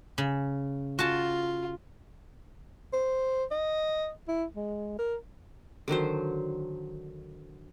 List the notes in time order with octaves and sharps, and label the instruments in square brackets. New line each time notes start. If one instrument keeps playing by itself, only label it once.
[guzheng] C#3
[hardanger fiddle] F4 [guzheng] F#4 A5
[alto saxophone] C5
D#5
E4
G#3
A#4
[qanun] D3 D#3 F#3 C5